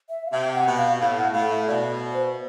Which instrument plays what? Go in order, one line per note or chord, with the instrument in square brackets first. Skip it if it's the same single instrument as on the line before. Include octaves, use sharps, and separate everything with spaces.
[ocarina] E5
F5
[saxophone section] C3 [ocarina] E5
[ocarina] F#5
[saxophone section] B2
[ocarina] F5
[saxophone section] A2 [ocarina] F5
[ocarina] F#5
[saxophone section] A2 [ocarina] F5
[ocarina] E5
[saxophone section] B2 [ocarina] D5
[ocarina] C5